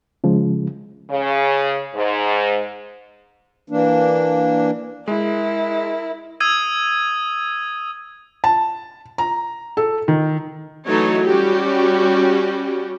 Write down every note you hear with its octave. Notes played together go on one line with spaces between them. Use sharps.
C#3 F3 G#3
C#3
G#2
E3 A#3 D4
G#3 E4 A#4
D#6 E6 G#6 D#7
A5
A#5
A4
D#3
E3 F#3 A3 D#4 A4 C#5
G3 C#4 F#4 G4